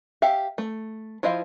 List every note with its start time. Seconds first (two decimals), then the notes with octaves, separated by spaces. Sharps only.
0.22 G4 E5 F5
0.58 A3
1.23 F3 E4 C5 D#5 F5